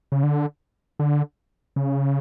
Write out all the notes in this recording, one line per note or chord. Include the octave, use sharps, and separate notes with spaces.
C#3
D3
D3
C#3